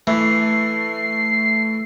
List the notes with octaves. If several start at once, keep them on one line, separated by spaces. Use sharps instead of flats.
E3 A3 C7